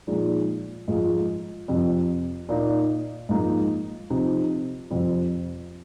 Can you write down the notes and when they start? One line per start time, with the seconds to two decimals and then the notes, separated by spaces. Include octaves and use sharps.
0.07 A#2 F3 G#3 D#4
0.88 G#2 F3 G#3 F4
1.68 F2 C3 F3
2.49 A#2 A#3 D#4
3.29 G#2 F3 A#3 D#4
4.10 C3 F3 C4 D#4
4.90 F2 C3 F3 C4